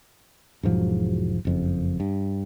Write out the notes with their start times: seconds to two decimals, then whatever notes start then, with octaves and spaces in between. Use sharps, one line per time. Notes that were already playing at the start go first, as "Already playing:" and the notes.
0.63 E1 G#2 F3 F#3
1.45 F#1 F2
2.00 G2